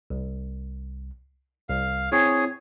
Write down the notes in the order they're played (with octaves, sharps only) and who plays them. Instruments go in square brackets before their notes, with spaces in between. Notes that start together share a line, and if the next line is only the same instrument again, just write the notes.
[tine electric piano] C2
[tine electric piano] C2 [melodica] F5
[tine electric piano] C4 E4 [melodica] G#4 C#5